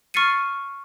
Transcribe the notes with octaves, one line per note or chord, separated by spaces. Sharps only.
C#6 F6 A6 C7 C#7 D#7